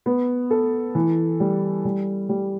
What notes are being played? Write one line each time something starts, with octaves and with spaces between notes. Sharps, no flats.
B3
A4
E3
G3
G3
G3